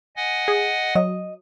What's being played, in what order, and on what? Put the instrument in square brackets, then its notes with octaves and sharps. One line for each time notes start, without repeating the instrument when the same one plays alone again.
[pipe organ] D#5 F#5 G#5
[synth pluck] G#4
[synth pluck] F#3 [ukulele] D#5